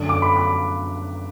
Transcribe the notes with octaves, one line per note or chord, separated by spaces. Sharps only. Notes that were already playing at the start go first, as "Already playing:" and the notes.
Already playing: F#2 D3 A3 D4
D6
B5
D6